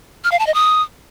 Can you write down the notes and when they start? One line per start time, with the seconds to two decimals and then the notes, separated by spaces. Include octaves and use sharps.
0.24 F6
0.32 F5
0.39 A5
0.47 D#5
0.54 D#6